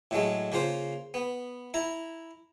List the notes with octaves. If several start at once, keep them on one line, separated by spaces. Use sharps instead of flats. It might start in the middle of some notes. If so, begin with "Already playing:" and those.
A2 F#3 G#3 A3
C#3 A#3 F4 C5
B3
E4 A#5